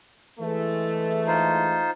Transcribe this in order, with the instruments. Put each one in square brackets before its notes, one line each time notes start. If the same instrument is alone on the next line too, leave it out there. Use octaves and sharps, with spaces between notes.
[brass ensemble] E3 G#3 A3
[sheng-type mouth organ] D#4 F4 C5